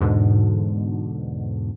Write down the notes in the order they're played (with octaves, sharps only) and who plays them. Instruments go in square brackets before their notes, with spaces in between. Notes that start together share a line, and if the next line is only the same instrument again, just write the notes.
[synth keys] E2 G#2 B2 D3